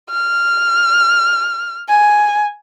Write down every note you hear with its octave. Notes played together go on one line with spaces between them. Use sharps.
F6
G#5